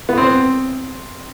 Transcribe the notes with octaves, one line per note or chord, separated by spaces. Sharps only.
B3
C4